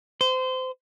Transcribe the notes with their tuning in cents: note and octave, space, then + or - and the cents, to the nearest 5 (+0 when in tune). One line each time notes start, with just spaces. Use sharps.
C5 -25